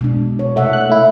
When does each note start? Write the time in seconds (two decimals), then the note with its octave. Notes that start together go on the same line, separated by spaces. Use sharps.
0.01 B2 G#3 D4
0.39 C#5
0.56 C3 A3 E5 F#5
0.73 F#6
0.89 A3 E4